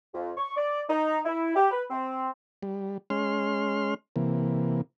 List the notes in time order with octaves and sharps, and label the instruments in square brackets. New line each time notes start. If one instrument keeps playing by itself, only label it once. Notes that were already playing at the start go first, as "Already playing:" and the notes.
[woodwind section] F2
C#6
D5
D#4
E4
G4
B4
C4
[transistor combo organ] G3
G#3 C#4 C6 F6
C3 E3 A#3